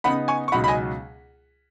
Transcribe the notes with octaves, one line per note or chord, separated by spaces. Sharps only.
C#3 B3 D#4 F#5 B5
G#5 C#6
C#6
C#2 B2 F#3 D#4 F#5 B5
B5
D#5 G#5